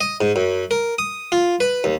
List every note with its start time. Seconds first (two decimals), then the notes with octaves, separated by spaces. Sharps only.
0.01 D#5
0.21 G#2
0.36 F#2
0.71 A#4
0.99 D#6
1.32 F4
1.60 B4
1.84 D#2